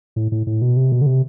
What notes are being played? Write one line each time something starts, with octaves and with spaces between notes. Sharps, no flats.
A2
A2
A2
B2
C3
B2
D3
C3